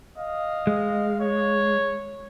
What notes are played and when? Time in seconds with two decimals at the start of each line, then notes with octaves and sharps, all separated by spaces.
0.18 D#5 F5
0.67 G#3
1.20 C#5